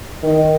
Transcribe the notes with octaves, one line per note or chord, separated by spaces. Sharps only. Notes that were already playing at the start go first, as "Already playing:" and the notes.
D#3